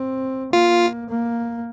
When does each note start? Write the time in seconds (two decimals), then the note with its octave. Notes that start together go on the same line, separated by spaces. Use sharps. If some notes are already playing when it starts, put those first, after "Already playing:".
Already playing: C4
0.53 A#3 F4
1.10 A#3